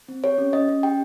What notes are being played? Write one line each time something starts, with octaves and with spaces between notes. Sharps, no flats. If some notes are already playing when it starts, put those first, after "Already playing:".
C4
G4 C#5
C#4
C#4 D#5
C#4
G4 G5